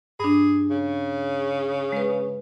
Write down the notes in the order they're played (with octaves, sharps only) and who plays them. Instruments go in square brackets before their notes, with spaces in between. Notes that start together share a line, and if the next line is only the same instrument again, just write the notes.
[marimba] G2 D4 [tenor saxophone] G#4
[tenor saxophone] C#3
[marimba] G#3 B4